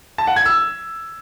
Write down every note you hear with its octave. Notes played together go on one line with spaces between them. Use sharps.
A5
F#5
G#6
E6